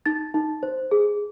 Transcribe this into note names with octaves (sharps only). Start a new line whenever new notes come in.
D#4 A6
D#4
C5
G#4